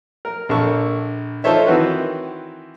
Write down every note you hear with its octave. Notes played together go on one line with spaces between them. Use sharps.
A#4
A#1 A#3 A4 C#6
D#4 F4 A4 C5 C#5 E5
D#3 E3 C4 F#4 B4